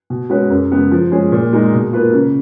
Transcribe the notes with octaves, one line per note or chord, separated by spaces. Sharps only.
B2
G#3 C#4 F#4 B4
F#2
C#3 G#3 B3
F3
G#3 C#4 G#4
A#2
G#3 D#4
B2
A#3 F4 B4
C#3